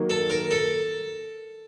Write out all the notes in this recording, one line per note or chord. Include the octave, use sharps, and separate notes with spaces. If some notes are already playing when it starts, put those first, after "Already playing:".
Already playing: D#3 F#3 A#3
A4
A#4
A4